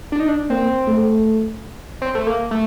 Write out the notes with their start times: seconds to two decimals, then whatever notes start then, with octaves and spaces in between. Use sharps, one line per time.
0.12 D4
0.20 D#4
0.28 D4
0.50 A#3 C4
0.88 A3
2.02 C4
2.15 A3
2.27 A#3
2.51 A3